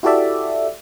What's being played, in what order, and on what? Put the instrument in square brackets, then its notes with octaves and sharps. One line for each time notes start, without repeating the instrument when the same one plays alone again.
[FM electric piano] E4 F#4 G4 A4 D5 E5